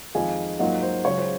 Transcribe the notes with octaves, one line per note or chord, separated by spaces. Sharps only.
F2 D#3 G#3 D#4 F5 G#5
G#2 F#3 A#3 F4 D#5 F#5
C5
C#2 C#3 F#3 C#5
C5